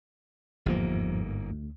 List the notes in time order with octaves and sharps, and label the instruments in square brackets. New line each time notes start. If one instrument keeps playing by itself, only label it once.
[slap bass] G1 G#2 A#3 [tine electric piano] E2 F3
[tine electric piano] D2